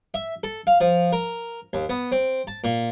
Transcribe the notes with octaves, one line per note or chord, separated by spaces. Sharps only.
E5
A4
F5
F3
A#4
D#2
B3
C4
A5
A#2